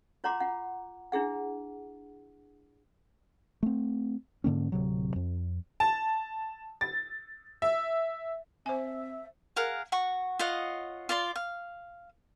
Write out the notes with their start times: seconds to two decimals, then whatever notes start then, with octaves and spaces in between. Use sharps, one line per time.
0.24 F4 C#5 F#5 A#5 C6 D6
0.41 F4 F#5
1.12 D4 E4 G#4 F#5
3.63 A3 C4
4.44 G#2 D3 A#3 C#4
4.72 D1 C3 F#3
5.16 F2
5.80 A5
6.81 A6
7.62 E5
8.66 C4 C5 E5 G#5
9.56 G#4 A#4 F5 F#5
9.92 F#4 F#5 C#6
10.39 F4 C#5 D#5 F#5
11.09 F4 D5 C6
11.36 F5